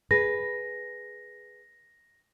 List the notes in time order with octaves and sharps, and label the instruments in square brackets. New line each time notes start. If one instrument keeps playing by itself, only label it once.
[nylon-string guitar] G#4 B4 [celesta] A#6